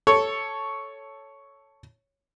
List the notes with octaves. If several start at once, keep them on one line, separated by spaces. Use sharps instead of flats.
A4 C#5